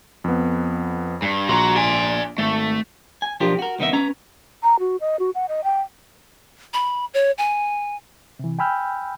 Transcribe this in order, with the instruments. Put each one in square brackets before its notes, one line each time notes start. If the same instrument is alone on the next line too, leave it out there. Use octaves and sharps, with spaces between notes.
[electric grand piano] F2 B3
[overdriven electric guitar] G2
[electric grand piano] A#1 C6 [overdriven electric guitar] F#4 A#5
[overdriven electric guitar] D5 G#5
[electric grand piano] G#1 A6 [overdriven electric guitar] A3
[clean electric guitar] G#5
B1 F3 D4 F4 G4 A#4
F#4 A#4
C2 D#3 B3 D#4 E5
C#4 B4 A#5
[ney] A#5
F#4
D#5
F#4
F#5
D#5
G5
[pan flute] B5
C#5
G#5
[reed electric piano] C3 E3
G5 G#5 B5 E6 F6 G6